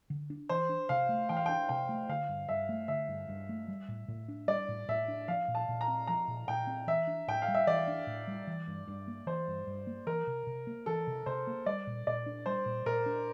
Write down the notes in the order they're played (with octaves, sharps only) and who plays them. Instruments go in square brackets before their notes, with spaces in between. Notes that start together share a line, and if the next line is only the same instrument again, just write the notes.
[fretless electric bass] D3
D4
[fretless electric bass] E3 [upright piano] C5
[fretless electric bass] D4
[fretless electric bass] C3 [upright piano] F5
[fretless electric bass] A3
[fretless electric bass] E3 [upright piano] G5
[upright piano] F5
[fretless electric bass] D4 [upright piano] G5
[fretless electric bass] C3 [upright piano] G5
[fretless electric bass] A3
[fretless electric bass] D3 [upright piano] F5
[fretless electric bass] G2
[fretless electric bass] G2 [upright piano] E5
[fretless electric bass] A3
[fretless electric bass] D3 [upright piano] E5
[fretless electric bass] G2
G2
A3
G3
A2
A2
D4
[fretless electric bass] G3 [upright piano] D5
[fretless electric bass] A2
[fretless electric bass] A2 [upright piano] E5
[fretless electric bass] D4
[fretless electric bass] F3 [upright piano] F5
[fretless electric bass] A#2
[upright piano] A5
[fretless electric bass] A#2
[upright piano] A#5
[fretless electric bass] C4
[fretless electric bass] F3 [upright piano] A#5
[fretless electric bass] A#2
[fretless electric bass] A#2 [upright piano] G5
[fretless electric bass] C4
[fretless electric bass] E3 [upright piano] E5
[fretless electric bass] D4
[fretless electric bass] A2 [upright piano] G5
[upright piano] F5
[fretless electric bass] G3
[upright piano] E5
[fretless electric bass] E3 [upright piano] D5
[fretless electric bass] D4
A2
G3
E3
G2
G2
A#3
[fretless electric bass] E3 [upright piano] C5
[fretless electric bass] G2
G2
A#3
[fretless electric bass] E3 [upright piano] A#4
[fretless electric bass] C3
C3
A#3
[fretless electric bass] E3 [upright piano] A4
[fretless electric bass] C3
[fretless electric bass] C3 [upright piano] C5
[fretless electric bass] A#3
[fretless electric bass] G3 [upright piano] D5
[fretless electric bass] A#2
[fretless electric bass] A#2 [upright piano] D5
[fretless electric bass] D4
[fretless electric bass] G3 [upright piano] C5
[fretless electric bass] A#2
[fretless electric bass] A#2 [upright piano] A#4
[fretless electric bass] D4